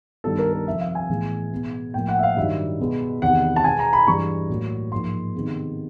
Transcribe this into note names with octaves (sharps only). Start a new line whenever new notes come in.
G2 D#3 G3 B3 A4
A#4
A#4
F2 C3 F3 E5
F5
G#5
A2 E3 G#3 B3
B2 G#3 B3
A2 F3 A#3 G5
F#5
E5
F5
G2 D#3 F#3 E5
B2 G#3 B3
E2 C3 D#3 F#5
A5
B2 G#3 B3 G#5
A#5
B5
G2 E3 G#3 C#6
A2 F#3 A#3
G#2 F3 A#3 C6
C3 D#3 G#3 B3